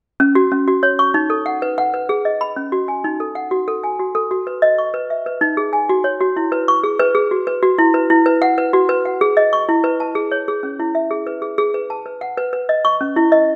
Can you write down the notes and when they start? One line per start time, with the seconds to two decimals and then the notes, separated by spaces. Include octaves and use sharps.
0.20 C#4
0.35 F#4
0.51 C#4
0.68 F#4
0.83 C#5
0.99 C#6
1.14 D#4
1.30 A4
1.46 F#5
1.62 B4
1.78 F#5
1.94 B4
2.09 G#4
2.25 D#5
2.41 B5
2.56 C#4
2.72 F#4
2.88 G#5
3.04 D#4
3.20 A4
3.35 F#5
3.51 F#4
3.68 A4
3.84 G#5
4.00 F#4
4.15 A4
4.31 F#4
4.47 B4
4.62 D#5
4.78 C#6
4.94 B4
5.10 E5
5.26 B4
5.41 D#4
5.57 G#4
5.73 G#5
5.89 F#4
6.04 C#5
6.20 F#4
6.36 E4
6.52 B4
6.68 C#6
6.83 G#4
6.99 B4
7.15 G#4
7.31 F#4
7.47 B4
7.63 F#4
7.78 E4
7.94 B4
8.10 E4
8.26 B4
8.42 F#5
8.58 B4
8.73 F#4
8.89 B4
9.05 F#5
9.21 G#4
9.37 D#5
9.53 C#6
9.69 E4
9.84 B4
10.00 A5
10.15 G#4
10.32 C#5
10.48 G#4
10.63 C#4
10.80 E4
10.95 E5
11.11 G#4
11.27 B4
11.42 G#4
11.58 G#4
11.74 B4
11.90 A5
12.06 B4
12.21 F#5
12.37 B4
12.53 B4
12.69 D#5
12.85 C#6
13.01 C#4
13.16 E4
13.32 D#5